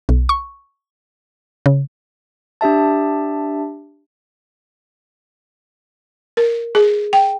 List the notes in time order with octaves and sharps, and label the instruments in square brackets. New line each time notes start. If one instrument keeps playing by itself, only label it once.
[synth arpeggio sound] B1
C#6
C#3
[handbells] D4 G4 E5 A5
[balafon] A#4
G#4
G5